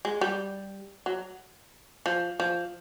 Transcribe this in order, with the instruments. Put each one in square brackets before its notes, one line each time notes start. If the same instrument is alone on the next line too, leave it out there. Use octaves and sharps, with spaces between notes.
[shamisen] G#3
G3
F#3
F3
F3